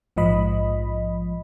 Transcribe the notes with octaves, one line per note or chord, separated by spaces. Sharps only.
A#1 G#2 F3 D#5 B5